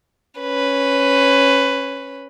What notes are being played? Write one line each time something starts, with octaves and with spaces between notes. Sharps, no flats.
C#4 B4